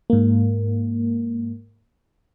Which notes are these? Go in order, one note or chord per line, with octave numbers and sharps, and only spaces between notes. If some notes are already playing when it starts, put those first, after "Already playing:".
G#2 A#3